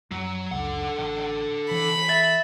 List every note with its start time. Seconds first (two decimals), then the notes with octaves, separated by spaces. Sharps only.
0.11 F#2 F#3
0.51 G#1 C#2 F#2 D3 F#5
0.99 A1
1.71 E3 B5
2.09 E5 A6